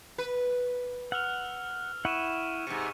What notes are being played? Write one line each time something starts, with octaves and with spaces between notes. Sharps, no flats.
B4
F#5 E6 F6 F7
E4 F#5 C#6 D#7 E7
G#2 C3 C#7